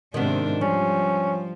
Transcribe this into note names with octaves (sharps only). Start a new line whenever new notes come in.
G#2 C3 D#3 B3 D4
F3 G3 C#4